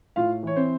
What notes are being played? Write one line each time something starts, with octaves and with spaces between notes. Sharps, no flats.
A2 F4 F5
E3 C#5
C4 C5